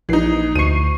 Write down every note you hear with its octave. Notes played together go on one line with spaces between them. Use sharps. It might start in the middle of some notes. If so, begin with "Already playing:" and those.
A#1 E3 D#4 C7
D2 C#6 C7 D#7